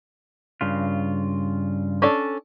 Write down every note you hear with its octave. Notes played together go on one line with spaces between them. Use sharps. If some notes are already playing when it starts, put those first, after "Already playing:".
G2 C#3 F4
C#4 D4 A4